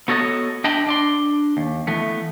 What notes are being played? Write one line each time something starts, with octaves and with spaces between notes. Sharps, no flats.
B3 F#4 A4 C#5 D#5
D4 D#5 G5 A5 B5
D4 D5 C6
D#2
E3 A3 B3